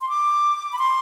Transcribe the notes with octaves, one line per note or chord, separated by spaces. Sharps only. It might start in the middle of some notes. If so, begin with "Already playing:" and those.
C6
D6
B5
C6